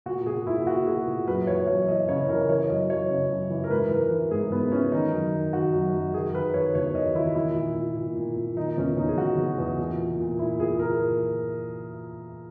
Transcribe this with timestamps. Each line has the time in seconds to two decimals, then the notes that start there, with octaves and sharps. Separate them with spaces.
0.06 A#2 F#4
0.26 A#2 G#4
0.47 A#2 E4
0.66 A#2 F#4
0.86 A#2 G#4
1.07 A#2
1.28 F#2 B4
1.47 E3 C#5
1.67 F#2 C#5
1.88 E3 D#5
2.09 C#3 C#5
2.29 E3 A#4
2.49 E3 C#5
2.70 F#2 D#5
2.90 F#2 C#5
3.10 C#3
3.30 F#2
3.50 E3
3.64 A#4
3.70 G#2 B4
3.91 E3 A#4
4.11 E3
4.31 G#2 G#4
4.52 G#2 B3
4.72 E3 C#4
4.92 D#3 D#4
5.12 F#2
5.33 D#3
5.53 D#3 F#4
5.73 F#2
5.94 F#2
6.14 D#3 G#4
6.33 D#3 B4
6.54 D#3 C#5
6.75 E2 C#5
6.95 D#3 D#5
7.15 D#3 E4
7.35 A#2 E4
7.56 A#2
7.75 A#2
7.97 A#2
8.16 A#2
8.36 A#2
8.57 D#3 D#4
8.77 E2 C#4
8.97 E2 D#4
9.09 G#4
9.18 E2 F#4
9.38 E2
9.58 E2
9.79 A#2
9.99 A#2
10.19 A#2
10.39 A#2 E4
10.60 A#2 G#4
10.79 A#2 A#4